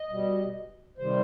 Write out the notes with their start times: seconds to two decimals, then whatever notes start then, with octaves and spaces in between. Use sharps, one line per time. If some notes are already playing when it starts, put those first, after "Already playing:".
Already playing: D#5
0.10 B2 G3
0.98 C3 D#3 G3 C5